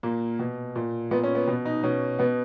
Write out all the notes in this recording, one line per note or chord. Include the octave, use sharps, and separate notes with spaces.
A#2 A#3
B2
A#2
A#2 B3
C#4
B3
B2 B3
D#4
B2 C#4
B2 B3